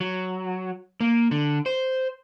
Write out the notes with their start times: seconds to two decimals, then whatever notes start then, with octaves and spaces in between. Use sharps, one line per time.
0.01 F#3
1.01 A#3
1.31 D3
1.66 C5